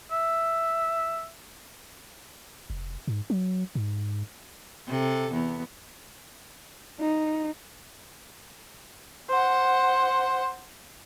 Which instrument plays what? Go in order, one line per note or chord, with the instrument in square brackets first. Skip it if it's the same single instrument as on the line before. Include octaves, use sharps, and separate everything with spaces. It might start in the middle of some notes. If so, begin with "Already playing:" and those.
[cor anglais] E5
[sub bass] F1
G#2
F#3
G#2
[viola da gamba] C3 A4
E2 B3
[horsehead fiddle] D#4
[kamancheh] C5 F#5